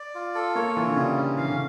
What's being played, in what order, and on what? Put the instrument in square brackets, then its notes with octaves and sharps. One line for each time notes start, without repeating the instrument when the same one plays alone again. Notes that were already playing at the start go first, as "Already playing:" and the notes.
Already playing: [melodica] D5
F4
A4
[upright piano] A#3 [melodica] C#5
[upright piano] E3 [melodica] F4
[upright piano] D3
[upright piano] C#3 [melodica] G3
[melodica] C#4
[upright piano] E3 [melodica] F5
[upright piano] D3
C#3